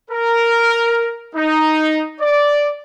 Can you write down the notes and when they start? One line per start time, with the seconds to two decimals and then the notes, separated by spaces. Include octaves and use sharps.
0.10 A#4
1.35 D#4
2.21 D5